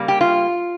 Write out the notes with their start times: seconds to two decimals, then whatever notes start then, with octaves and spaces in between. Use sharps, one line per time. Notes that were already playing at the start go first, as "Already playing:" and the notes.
Already playing: C#3 G3 A#3
0.08 G4
0.21 F4